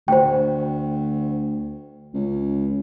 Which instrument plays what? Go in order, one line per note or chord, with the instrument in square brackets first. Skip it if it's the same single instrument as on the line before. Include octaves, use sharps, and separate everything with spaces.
[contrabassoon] D2 [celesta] C5 G5
[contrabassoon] C#2